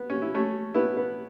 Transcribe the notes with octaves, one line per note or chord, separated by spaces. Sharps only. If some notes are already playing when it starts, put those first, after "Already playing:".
Already playing: B3
C#4
E4
A3 C#4
B3 E4
B3